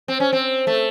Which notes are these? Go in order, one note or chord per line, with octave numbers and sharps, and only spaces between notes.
C4
C#4
C4
A3